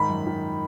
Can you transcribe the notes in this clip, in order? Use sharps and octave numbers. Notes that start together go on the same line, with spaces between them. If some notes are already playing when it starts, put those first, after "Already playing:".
Already playing: G#2 D#3 B5
F#2
D#3